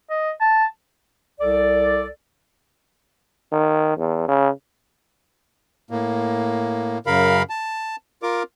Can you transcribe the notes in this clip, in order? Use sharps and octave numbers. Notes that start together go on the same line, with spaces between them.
D#5
A5
C2 A4 D5
D#3
E2
C#3
A2 A#3
F#2 C#3 A#4 F5 B5
A5
F4 A#4 D6